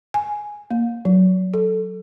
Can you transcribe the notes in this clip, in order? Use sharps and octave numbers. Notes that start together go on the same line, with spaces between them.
G#5
A#3
F#3
A4